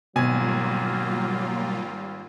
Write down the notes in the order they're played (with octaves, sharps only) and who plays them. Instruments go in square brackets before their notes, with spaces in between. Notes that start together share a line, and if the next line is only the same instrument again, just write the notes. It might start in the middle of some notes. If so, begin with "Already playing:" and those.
[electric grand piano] G#1 G#5 [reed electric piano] B2 [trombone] F#3 [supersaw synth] G3 A#3 F4